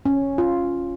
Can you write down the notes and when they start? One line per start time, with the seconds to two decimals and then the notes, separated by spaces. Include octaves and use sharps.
0.06 C#4
0.38 F4